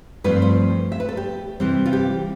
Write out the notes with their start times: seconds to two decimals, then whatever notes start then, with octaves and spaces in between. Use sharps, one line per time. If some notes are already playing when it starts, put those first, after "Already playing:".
0.24 G2 F3 A3 C4 B4
0.42 C5
0.92 E5
1.00 B4
1.09 A4
1.17 G4
1.60 C3 E3 G3 C4
1.86 F4
1.93 G4